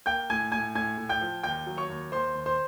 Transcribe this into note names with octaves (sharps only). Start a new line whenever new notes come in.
A#3 G5 G6
A2 G#5 G#6
A2 G#5 G#6
A2 G#5 G#6
A2
G5 G6
F3
D#2 G5 G6
F#3
C#5 C#6
D#2
D#2 C5 C6
D#2
C5 C6